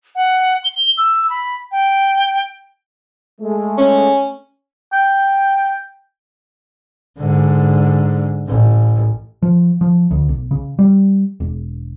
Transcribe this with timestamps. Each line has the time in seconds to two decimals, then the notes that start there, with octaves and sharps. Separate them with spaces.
0.15 F#5
0.64 G7
0.98 E6
1.30 B5
1.71 G5
3.41 G#3 A3
3.78 C#4
4.93 G5
7.19 G#2 D3
8.48 A1
9.43 F3
9.81 F3
10.11 D2
10.29 B1
10.51 C#3
10.79 G3
11.40 E1